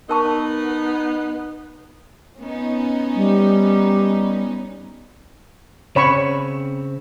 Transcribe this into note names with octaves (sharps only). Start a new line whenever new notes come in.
B3 D#4 A#4 A5 C#6
B3 C#4 D#4
G3
C#3 C4 C#5 B5 C#6